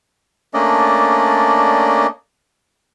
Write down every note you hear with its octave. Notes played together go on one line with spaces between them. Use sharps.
A3 A#3 C#4 D4 D5 D#5